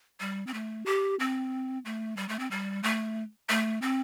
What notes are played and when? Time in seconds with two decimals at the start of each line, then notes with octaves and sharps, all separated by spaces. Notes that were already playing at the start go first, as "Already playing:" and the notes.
0.20 G3
0.47 C4
0.54 A3
0.86 G4
1.20 C4
1.85 A3
2.17 G3
2.29 A3
2.39 C4
2.51 G3
2.83 A3
3.49 A3
3.82 C4